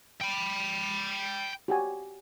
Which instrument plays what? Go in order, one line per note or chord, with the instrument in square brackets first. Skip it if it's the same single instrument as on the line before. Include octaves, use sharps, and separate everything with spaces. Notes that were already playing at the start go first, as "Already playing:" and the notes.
[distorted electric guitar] G5 B5
[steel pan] F#4 G4 G#5